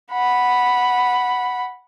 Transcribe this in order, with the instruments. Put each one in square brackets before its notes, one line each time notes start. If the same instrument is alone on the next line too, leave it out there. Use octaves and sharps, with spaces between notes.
[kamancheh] F#5 B5